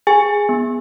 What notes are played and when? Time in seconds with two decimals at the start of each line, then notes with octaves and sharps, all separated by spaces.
0.07 G#4 G#5
0.49 B3